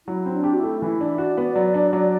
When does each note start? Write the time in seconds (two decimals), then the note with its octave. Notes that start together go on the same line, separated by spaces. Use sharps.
0.07 F#3 E4
0.26 C4
0.32 D4
0.44 G4
0.52 F#4
0.57 E4
0.63 A3
0.81 E3 E4
1.01 D4
1.18 F#4 D5
1.37 B3
1.56 F#3
1.74 D4
1.93 F#3